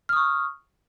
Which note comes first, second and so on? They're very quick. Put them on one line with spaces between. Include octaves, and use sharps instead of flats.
F6 D#6 C#6